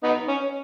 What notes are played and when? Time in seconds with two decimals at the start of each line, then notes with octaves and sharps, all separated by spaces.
0.03 B3 D#4
0.28 C#4